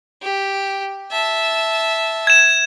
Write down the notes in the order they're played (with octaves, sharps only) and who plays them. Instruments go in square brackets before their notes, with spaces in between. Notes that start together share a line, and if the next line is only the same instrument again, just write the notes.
[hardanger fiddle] G4
E5 A5
[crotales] G#6 E7